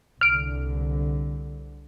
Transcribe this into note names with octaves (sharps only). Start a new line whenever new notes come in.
C2 D3 F6 D7